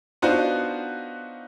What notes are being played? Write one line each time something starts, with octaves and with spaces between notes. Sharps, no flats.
B3 D4 D#4 F4 F#4 C5